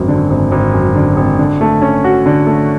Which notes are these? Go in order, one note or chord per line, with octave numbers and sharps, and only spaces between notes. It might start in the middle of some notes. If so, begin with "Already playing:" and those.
Already playing: G#1 F#2
D3
G#1
G#1
F#2
D3
G#1
D3
A3
C#4
F#4
D3
A3